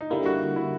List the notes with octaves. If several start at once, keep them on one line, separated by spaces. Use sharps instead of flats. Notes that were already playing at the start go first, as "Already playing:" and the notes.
D#4
D3 G3 A#3 E4
F#4
E4